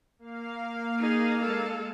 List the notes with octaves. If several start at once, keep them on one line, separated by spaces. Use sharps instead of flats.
A#3 F5
D#4 G#4
G#3 A4